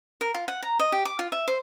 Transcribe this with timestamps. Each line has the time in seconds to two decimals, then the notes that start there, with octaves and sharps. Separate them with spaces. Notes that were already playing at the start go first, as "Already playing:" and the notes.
0.21 A#4
0.34 F4
0.48 F#5
0.63 A#5
0.79 D#5
0.92 G4
1.05 D6
1.19 F4
1.32 E5
1.48 C5